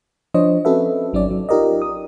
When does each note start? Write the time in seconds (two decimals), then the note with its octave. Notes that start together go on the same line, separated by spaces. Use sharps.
0.34 F3 D4 C5 C#5 D#5
0.65 C4 C#4 F#4 A4 B4 E5
1.13 G#1 F#3 C#4 D#4 D5
1.31 F#3
1.49 D#4 F4 G4 A#4 D5 D#5
1.82 D#6